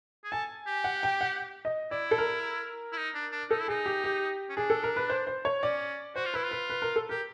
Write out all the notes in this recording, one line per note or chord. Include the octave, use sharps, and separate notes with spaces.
G#4
A4 G#5
G4
F#5
G5
F#5
D#5
E4 D5
A4
A#4
E4
D#4
D4
D4
D#4 A4
E4
D#4 G#4
G4
G4
C#4
D4 G#4
A4
A#4
B4
C5
C5
C#5
C#4 D5
F#4 C5
F4
E4 B4
F4
B4
B4
A#4
A4
G4 A#4